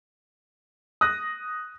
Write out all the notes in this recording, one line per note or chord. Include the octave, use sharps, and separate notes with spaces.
D#6 F#6 A#6